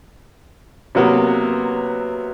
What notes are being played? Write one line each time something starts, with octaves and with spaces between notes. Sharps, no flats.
C3 F#3 A#3 B3